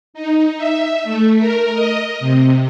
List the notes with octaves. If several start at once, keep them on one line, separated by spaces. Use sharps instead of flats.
D#4
E5
A3
A#4
D#5
C3